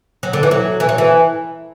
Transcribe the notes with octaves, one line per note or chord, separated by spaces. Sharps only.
F#3
D3
E3
F#3
E3
F#3
E3